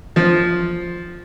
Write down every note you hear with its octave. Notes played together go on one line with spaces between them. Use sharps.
F3